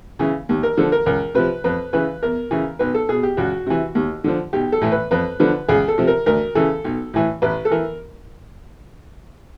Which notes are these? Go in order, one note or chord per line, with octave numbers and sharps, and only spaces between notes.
C#3 E3
D#2
A#4
D3 F3 A4
A#4
C#2 A#4
C3 F3 B4
F2 B4
C#3 E3 B4
E2 A#4
C#3 E3
B1 B4
A4
B2 G#4
G4
C#2 F#4
C3 E3
D#2
D3 F3
B1 G4
A4
A2 E3
B4
F2 B4
D3 F3 B4
C#2 G#4
A4
C3 F3
A#4
D2 A#4
C#3 E3 A4
B1
A2 E3
A1 B4
A4
E3 A#4